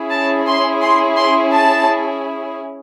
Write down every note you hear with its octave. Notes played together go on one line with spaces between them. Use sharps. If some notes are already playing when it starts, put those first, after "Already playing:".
Already playing: C#4 E4 G#4
A5
C6
C6
C6
A5